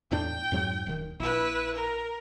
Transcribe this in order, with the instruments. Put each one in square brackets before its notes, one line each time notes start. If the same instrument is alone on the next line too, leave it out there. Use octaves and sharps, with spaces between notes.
[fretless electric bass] E2 A2 D4 [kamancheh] G5
[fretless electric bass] F2 G#2 F#3
D1 D#3
[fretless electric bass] A#1 [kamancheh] E4 B4
[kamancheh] A#4